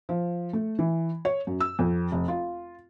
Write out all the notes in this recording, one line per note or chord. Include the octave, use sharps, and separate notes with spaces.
F3
A3
E3
C#5
F#2
E6
F2
F1
F4